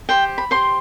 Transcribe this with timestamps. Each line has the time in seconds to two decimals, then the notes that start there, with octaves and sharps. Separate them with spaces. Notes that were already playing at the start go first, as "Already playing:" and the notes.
0.09 G4 C5 G5
0.38 B5
0.51 G4 C5 C6